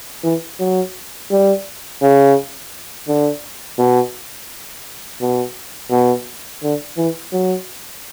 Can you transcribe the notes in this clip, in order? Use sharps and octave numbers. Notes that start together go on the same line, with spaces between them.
E3
F#3
G3
C#3
D3
B2
B2
B2
D3
E3
F#3